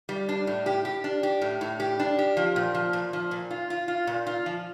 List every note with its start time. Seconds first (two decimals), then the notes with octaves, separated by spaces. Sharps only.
0.09 G3
0.29 D4
0.47 A2
0.66 G4
0.85 G4
1.04 D4
1.23 G4
1.41 A2
1.61 A2
1.80 G4
1.99 D4
2.19 G4
2.37 F3
2.56 A#2
2.74 F3
2.93 A#2
3.13 F3
3.31 A#2
3.51 F4
3.70 F4
3.88 F4
4.07 A#2
4.27 F4
4.46 F3